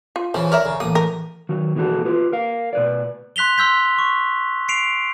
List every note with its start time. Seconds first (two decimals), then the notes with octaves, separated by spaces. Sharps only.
0.16 F4
0.34 C#3 E3 F3
0.52 A#4 C#5 D5 E5
0.65 C#3
0.80 A1 A#3 D#6
0.95 A#4
1.49 D#3 F#3 F#4
1.75 B2 E3 G#3 F#4 A4
2.05 F4 G4 B4
2.32 A#4 F5
2.73 B2 B4 D5
3.36 C6 F#6 B6 F7 G7
3.58 C6 E6 G6 B6
3.99 C#6
4.69 C7 D7 F7